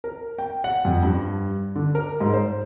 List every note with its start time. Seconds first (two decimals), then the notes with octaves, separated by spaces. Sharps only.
0.04 A#4
0.38 G5
0.64 F#5
0.85 F2
1.03 G2
1.75 D3
1.95 A#4
2.20 G#2
2.34 C5